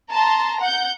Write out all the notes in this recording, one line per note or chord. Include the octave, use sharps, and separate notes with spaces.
A5 A#5 C6
F#5 G6